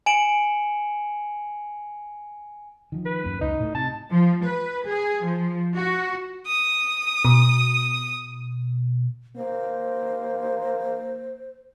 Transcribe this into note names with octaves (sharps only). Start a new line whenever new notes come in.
G#5 C#7 D7 E7 F#7
D#3 F3
B4
F#2 A#3
C#2 D#4
A2
C3 A5
F3
B4
G#4
F3
F#4
D#6
B2
A#3 C5